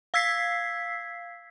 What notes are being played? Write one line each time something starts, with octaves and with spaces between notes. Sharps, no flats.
F5 E6 G#6 B6 C7